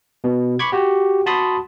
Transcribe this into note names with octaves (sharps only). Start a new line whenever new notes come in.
B2
B5 C#6 D6 G#6
F#4 G4
F#4 A5 B5 C6 D#6